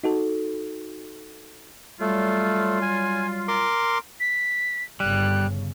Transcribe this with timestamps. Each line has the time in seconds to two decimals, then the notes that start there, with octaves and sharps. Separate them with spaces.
0.04 D#4 F#4 A4
2.01 F#3 G3 A3 F4
2.82 G#5
3.48 A#4 C6 D6
4.20 B6
5.00 G1 C#3 G3 F#6